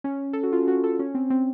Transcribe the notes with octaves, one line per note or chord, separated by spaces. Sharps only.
C#4
A4
F#4
F4
F#4
A4
C#4
C4
C4